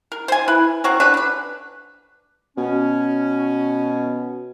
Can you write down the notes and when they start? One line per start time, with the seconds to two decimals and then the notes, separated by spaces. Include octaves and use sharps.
0.12 A#4
0.28 C5 G#5
0.48 E4 B4
0.84 C4 C#4 F#4 A#4
1.00 C#4 D4 B4
1.14 D3 B4
2.57 B2 C#4